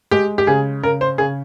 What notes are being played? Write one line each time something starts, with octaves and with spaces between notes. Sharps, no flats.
G#3 G4
G4
C#3 G#4
C#3 A#4
C5
C#3 G#4